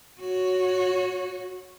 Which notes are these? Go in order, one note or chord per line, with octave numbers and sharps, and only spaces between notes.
F#4 C#5